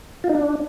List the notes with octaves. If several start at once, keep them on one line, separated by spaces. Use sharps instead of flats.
F4
D#4
D4